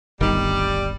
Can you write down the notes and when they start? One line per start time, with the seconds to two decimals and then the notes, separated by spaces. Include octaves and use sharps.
0.20 D1 G1 D#3 G3